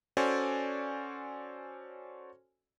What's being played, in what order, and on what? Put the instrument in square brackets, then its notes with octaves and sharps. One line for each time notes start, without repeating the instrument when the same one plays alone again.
[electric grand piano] C#4 F#4 A4 C5 D5 G#5